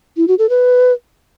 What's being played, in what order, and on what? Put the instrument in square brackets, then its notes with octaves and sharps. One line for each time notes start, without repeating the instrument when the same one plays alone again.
[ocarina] E4
F#4
A4
B4